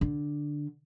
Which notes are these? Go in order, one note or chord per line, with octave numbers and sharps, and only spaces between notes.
D3